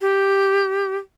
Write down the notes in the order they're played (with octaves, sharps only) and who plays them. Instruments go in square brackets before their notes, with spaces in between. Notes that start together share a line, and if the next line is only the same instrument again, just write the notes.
[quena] G4